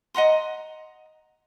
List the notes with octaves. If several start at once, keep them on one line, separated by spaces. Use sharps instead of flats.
D#5 F#5 A#5 C6